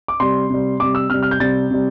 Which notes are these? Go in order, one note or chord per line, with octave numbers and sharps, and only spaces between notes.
D6
C3 G3 C6
C3 G3
C3 G3 D6
E6
C3 G3 F6
F6
G6
C3 G3 A6
C3 G3